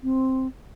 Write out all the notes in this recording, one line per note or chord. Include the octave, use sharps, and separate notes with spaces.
C4